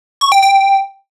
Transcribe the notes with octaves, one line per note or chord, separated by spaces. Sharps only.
C#6
G5
G5